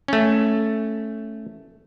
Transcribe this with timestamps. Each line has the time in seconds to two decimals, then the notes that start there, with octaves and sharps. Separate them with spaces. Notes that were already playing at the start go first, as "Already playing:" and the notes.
0.08 A3 C#4